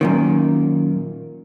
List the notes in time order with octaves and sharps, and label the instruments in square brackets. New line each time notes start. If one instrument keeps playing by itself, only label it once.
[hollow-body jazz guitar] F#2 A#2 D#3